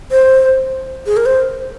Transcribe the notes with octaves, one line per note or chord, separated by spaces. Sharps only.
C5
G#4
A#4
C5